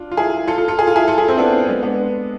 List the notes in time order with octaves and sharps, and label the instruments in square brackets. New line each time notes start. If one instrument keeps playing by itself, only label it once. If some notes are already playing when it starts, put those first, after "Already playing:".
Already playing: [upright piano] D4 F4
F4
E4 G#4
F4 A4
F4 A4
F4 A4
G#4
F4
E4 G#4
F4 A4
E4 G#4
C4 E4
B3 D4
G#3 B3
B3 D4